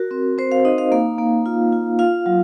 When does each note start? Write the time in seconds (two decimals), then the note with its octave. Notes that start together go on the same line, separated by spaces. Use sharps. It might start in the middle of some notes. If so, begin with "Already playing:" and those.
Already playing: F#4 A#4
0.11 C4
0.38 C4 C5
0.52 F5
0.65 D#4 D#5
0.78 F5
0.92 A#3 F5
1.19 A#3
1.46 F4
1.72 F4
1.99 F4 F5
2.26 F#3